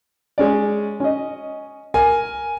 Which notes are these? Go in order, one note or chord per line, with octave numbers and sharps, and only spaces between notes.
G#3 C#4 D5
C#4 D#5
A#4 G#5